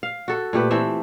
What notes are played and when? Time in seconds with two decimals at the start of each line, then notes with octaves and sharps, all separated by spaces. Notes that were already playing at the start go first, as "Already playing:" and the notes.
0.03 F5
0.28 F#4 A4
0.53 A#2 A3 G4 B4
0.71 E3 A3 C4 E5